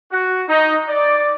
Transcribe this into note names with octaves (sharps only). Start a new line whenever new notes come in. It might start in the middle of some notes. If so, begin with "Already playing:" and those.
F#4
D#4
D5